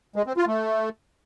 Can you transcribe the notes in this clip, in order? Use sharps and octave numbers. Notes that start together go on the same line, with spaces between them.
G#3
C4
F4
A3